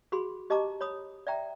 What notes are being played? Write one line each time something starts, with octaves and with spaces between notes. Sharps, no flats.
F#4 G#4 B5 C6
G4 D#5 A5 A#5 D6
C#5 B5 D#6
D5 E5 G5 A#5